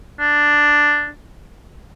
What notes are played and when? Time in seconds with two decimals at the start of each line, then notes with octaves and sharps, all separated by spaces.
0.19 D4